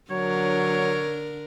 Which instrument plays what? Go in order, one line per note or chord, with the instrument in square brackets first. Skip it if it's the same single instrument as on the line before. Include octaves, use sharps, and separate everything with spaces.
[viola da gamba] D3 D4 A#4 [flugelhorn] F#3 [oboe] C#5